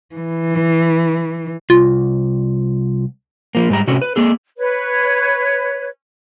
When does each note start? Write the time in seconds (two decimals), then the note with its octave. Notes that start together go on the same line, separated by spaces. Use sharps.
0.16 E3
1.70 C2 F4
3.55 F3 A#3
3.70 G#2 G3 A#5
3.87 C3 C#4 F#4 A4
4.02 B4
4.16 A#3 G#4 A4
4.58 B4 C#5